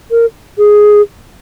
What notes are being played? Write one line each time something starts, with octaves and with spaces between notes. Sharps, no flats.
A#4
G#4